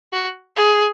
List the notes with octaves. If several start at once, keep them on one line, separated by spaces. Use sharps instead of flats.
F#4
G#4